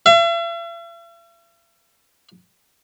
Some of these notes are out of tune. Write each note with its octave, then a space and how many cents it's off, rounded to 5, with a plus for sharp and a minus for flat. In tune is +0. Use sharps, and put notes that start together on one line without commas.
E5 +45